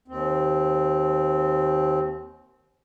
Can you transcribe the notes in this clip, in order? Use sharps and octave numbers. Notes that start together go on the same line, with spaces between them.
D#2 C4